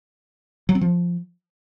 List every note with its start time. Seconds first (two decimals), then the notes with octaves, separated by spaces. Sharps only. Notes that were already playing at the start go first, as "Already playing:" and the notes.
0.69 F#3
0.75 C4
0.81 F3